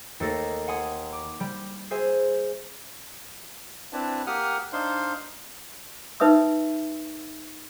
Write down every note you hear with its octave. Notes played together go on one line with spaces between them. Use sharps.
D#2 A3 A4 A6 A#6
F#5 G#5 C6 D#6
D6
G3
G#4 C5 E5 G#5
C4 D4 E4 B4 A5
A#3 G4 F#5 D#6 F6
D4 D#4 C5 F5 C6
D#4 B4 E5 D#6 E6